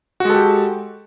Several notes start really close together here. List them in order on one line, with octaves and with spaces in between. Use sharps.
F#4 G#3 A4 G4